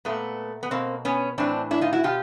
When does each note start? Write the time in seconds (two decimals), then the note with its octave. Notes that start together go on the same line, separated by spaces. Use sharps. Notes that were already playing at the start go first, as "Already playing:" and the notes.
0.05 A#2 A3 B3
0.63 B3
0.71 B2 A#3 C4
1.05 B3 C#4
1.38 A2 E3 C4 D4
1.71 D4 E4
1.81 D#4 F4
1.93 E4 F#4
2.03 B2 F4 G4